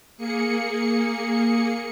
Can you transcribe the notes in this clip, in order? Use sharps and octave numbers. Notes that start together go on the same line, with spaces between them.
A#3 G#4 C#7